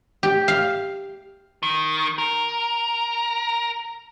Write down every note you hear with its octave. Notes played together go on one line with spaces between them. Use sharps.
G4
F5
D#3
A#4